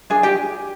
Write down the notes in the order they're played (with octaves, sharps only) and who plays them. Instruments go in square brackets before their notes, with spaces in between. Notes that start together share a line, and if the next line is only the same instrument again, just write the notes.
[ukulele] D4 G#4 G#5
G4 G5